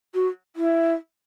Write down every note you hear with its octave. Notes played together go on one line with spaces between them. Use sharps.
F#4
E4